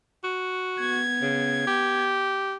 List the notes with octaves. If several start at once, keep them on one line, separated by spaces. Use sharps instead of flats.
F#4
B3 G#6
C#3
G4